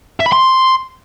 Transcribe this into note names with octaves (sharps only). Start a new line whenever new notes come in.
E5
B5
C6